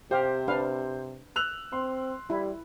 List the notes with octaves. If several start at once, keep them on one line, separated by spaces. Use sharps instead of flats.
C3 G4 C5 F5
D4 B4 F5
E6 F#6 F7
C4 C6
G3 E4